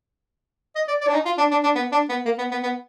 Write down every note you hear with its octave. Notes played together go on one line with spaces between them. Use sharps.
D#5
D5
D5
D4
D#4
F4
D4
D4
D4
B3
D4
B3
A#3
B3
B3
B3